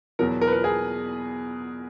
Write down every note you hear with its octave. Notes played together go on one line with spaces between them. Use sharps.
E2 B2 F#3 A#4
A#4
B4
A#4
G#4